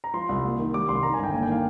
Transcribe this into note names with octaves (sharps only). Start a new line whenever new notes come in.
A#5
F3 C6
C2
A#3
D#3
G3 D6
C2 C6
D#3 A#5
G1 G#5
G5
A#3 G#5
G5
D#3 F5